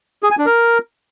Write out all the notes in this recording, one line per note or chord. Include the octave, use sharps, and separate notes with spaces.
G#4
G#5
D4
A#4